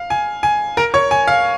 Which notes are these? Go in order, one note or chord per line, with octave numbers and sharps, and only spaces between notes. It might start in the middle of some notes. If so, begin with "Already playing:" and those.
Already playing: F5
G#5
G#5
A#4 A#5
C#5 C#6
G#5
F5